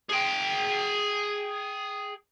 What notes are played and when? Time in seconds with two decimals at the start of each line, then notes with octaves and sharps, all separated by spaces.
0.09 G#4 G5